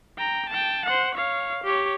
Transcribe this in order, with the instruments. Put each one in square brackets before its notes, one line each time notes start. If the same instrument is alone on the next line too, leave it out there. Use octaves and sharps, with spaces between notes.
[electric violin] G5 A#5
G5 A5
C5 F#5
C#5 F5
G4 C#5